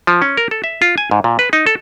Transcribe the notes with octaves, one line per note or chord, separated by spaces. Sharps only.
F3
C#4
A#4
A4
E5
F4
G#5
G#2
A#2
B4
D#4
A4